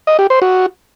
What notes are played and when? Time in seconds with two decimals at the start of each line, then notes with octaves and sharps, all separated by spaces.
0.07 D#5
0.19 G4
0.30 C5
0.42 F#4